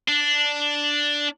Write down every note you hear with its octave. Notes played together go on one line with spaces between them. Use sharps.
D4